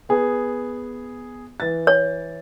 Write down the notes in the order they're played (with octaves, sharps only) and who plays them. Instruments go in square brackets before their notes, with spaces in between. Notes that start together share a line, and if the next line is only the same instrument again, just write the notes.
[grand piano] B3 G#4
E3 A6
[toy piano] C#5